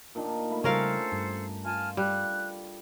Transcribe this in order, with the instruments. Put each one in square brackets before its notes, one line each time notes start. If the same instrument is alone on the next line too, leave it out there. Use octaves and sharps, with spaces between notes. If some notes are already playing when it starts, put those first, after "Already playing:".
[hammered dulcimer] A#2 D#3 D4
[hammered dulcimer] A3 [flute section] B5
[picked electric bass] C#3 G3 [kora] C#4 A#4 F5 [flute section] A4 C5
[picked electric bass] G2
[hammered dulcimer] F4 [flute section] G#5 A5 F6
[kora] G3 [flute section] F#6